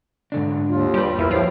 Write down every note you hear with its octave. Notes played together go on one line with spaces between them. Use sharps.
G#2 D3 D4
D#2 F4
G3 G4 B4
E2 E4 A#4
A2 F3 F4 G4 C5